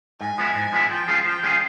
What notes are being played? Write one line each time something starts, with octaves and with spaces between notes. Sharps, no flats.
G#2 G#5
F3 G#3 B3 E4
G#2
F3 G#3 B3 E4
F3 G5
G#3 C#4 F4 G#4
F3 G5
G#3 C#4 F4 G#4